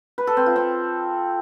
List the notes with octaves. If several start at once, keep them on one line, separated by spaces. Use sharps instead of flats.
B4
A4
C4
F4
C4